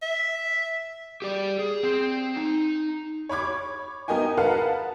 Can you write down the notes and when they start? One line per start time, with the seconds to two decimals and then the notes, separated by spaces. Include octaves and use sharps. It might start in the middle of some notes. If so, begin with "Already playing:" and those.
0.02 E5
1.22 G4 D5
1.59 G#4
1.83 C4 G5
2.37 D#4
3.29 C#5 B5 D6 G#6
4.08 B3 D#4 A#4 D#5 G5 G#5
4.37 A#4 B4 F5 F#5 A5